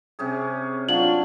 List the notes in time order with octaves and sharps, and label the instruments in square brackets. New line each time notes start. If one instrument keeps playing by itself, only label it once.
[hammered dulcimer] C3 C#4 G#4
[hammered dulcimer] F#3 [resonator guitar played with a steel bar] D4 [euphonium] F4 [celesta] F#7